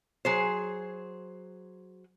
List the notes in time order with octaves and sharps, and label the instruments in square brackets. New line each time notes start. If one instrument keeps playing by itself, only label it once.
[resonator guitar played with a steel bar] F#3 G#4 C5